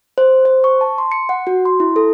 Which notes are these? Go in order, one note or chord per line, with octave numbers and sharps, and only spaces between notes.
C5
C5
C#6
A5
C6
C#7
F#5
F#4
C6
E4
A4